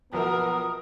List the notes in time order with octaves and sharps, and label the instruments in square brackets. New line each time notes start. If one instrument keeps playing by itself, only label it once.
[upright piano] B1 F3 E5 [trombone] B3 [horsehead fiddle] A#4 [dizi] D#6